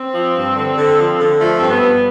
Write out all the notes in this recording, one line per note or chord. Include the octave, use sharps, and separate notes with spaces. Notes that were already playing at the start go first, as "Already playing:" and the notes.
Already playing: C4
F3
G2
D3
D3
F3
D3
F3 A3
G2 C4
B3
G2